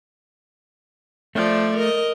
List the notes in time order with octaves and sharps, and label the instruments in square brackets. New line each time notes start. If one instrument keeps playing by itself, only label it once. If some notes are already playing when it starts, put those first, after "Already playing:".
[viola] F3 D5 [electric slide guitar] A3
[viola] A#4 D#5